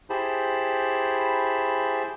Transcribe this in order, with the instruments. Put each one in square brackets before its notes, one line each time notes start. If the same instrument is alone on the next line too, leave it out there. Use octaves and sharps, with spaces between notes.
[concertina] E4 G4 G#4 C5 A5 B5